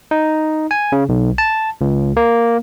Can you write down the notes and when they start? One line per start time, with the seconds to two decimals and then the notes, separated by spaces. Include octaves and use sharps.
0.11 D#4
0.71 G#5
0.92 C#3
1.09 B1
1.38 A5
1.81 C#2
2.17 A#3